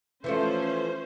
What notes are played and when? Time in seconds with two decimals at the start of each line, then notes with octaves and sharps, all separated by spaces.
0.24 E3 F3 A3 C#4 C5